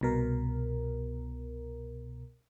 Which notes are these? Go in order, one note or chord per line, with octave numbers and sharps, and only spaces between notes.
C2 B2 A#4